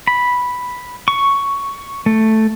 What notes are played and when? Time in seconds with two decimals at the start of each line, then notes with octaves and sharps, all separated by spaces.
0.07 B5
1.08 C#6
2.06 A3